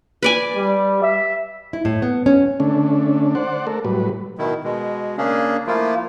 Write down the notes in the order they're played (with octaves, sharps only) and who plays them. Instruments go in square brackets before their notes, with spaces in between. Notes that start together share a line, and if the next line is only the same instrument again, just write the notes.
[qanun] B4 D5 G#5
[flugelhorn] G3
E5
[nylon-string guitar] E4
A2
B3
C#4
[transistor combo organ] D3 A3 C#4 D4
C5 D5 F#5
A3 A4 A#4
A2 F#3 G3 B4
[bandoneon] B2 D#3 E4
B2 G#3
C#3 A#3 C#4 D4 G#4
F3 A3 A#3 E4 F4